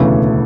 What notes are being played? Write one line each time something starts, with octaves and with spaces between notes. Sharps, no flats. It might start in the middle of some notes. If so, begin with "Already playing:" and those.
Already playing: E1 D2 C#3 E3 A3